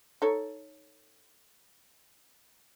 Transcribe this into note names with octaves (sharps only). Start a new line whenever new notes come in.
D#4 A4 C#5